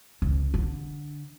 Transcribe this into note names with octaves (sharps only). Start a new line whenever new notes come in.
C#2
D3